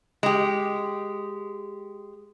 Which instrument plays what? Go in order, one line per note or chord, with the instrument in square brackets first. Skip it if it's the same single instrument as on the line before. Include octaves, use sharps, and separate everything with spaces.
[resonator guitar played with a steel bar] G#3 G4